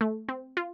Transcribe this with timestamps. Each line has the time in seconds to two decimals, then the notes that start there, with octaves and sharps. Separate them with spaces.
0.01 A3
0.28 C4
0.57 F4